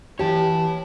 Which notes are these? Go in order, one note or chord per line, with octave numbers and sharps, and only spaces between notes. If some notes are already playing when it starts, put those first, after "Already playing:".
E3 G4 C#5 A5